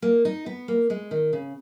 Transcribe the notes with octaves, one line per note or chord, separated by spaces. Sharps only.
A#3
D#4
B3
A#3
G#3
D#3
C#3